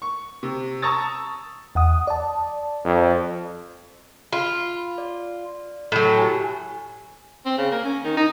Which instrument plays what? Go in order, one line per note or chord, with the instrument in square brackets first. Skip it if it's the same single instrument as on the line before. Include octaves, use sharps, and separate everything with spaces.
[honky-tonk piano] C#6
C3
A5 A#5 C#6 D#6 E6 A6
[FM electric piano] E2 F#5 D#6
D5 A5
[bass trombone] F2
[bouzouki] F4 [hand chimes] B5
[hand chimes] D5
[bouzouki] A2 F#3
[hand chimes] G4 G#5
[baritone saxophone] C4
C#3
A#3
C#4
D#3
D#4